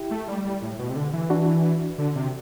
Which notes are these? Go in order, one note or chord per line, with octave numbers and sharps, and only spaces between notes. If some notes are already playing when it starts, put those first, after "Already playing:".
Already playing: E4 G4
A3
G3
G3
A2
B2
C3
D3
E3
D4 F#4
D3
C3